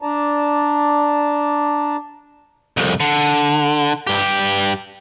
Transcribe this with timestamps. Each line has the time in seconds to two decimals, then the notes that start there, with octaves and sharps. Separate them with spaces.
0.02 D4 D5 A5 A#5
2.77 C2 F2
3.00 D3
4.07 G2 G4